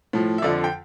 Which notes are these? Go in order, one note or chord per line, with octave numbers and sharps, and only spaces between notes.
A2 F3
E5
F2 D3 F3 D5
G5